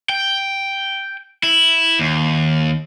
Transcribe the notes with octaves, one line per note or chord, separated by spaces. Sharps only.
G5
E4
D#2